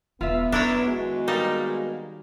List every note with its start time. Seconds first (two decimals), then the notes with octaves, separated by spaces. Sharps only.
0.21 E1 B3 F4 E5
0.52 F#2 D#3 D4 E4 C#5
0.86 G#3 B3 F#4
1.28 G3 A#3 D#4